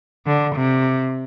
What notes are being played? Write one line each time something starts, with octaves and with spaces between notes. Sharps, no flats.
D3
C3